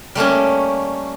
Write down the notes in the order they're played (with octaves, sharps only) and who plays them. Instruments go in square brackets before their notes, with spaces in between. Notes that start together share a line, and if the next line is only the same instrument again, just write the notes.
[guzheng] G3 A3 A#3 C#4